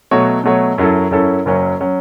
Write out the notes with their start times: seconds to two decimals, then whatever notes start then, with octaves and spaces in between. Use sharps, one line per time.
0.11 B2 F#3 A3 F#4 C#5
0.44 B2 F#3 A3 F#4 C#5
0.78 F#2 F#3 C#4 E4 A4
1.11 F#2 F#3 C#4 E4 A4
1.45 F#1 F#2 F#3 C#4
1.81 F#3 C#4